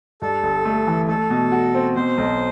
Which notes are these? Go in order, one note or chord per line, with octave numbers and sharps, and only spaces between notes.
G2 A4
G1
A3
E3
A3 A4
B2
F#4
C4
B2 C5
B1